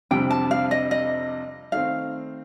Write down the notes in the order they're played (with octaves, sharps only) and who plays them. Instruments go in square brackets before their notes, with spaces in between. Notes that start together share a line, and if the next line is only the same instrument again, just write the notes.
[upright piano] F2 C3 G3 D4 [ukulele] G5
[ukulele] A5
F5
D#5
D#5
[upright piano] D#3 A3 C4 [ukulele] F5